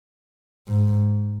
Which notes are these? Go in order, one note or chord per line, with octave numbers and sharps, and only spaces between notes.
G#2